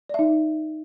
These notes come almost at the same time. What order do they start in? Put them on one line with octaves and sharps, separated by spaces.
D5 E5 D#4